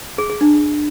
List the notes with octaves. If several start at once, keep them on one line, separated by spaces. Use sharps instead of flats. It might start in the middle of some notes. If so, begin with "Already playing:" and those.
G#4
G#4
D4